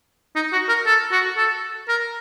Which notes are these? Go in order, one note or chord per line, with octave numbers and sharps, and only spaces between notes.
D#4
F#4
A#4
A4
F#4
A4
A#4